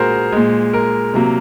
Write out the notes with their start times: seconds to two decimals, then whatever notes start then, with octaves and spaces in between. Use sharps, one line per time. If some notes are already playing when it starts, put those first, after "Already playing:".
Already playing: A#2 G#3 F#4 G#4 A#4 C5
0.32 A#2 G#3
0.73 A#4
1.14 C3 F#3 A#3